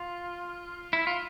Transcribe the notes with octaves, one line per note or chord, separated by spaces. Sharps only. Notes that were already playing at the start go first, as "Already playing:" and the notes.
Already playing: F4
E4
F4